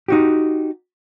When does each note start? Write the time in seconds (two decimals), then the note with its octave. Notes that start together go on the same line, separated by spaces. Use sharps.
0.08 D#4 F#4 G4